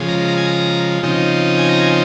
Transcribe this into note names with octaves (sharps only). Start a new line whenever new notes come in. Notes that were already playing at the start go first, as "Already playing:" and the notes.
Already playing: C#3 F3 G#3
A#5
A#5
G#5
A#5
C#3 F3 C4 D#4
G#5
A#5
G#5